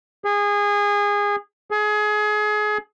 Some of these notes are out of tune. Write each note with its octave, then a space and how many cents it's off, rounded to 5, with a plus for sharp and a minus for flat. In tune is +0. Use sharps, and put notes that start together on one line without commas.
G#4 -25
G#4 +25